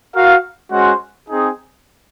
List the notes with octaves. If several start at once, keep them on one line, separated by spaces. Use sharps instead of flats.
F#4 A#4 F5
G#3 C#4 F#4 C5 F#5
C4 D#4 G#4